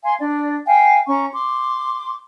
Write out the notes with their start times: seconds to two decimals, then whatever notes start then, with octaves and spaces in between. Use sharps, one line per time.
0.04 F5 G#5 C6
0.19 D4 D5
0.67 F5 G5 G#5
1.08 C#4 A#5 C#6
1.32 C6 D6